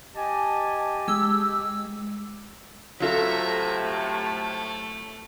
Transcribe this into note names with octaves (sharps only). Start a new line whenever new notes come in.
G4 D#5 G#5 A5
G#3 E6
A2 C3 F#3 F4 A4 E5 A#5
A3